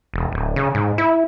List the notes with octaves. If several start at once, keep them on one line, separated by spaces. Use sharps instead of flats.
E1
D1
C#3
G#2
E4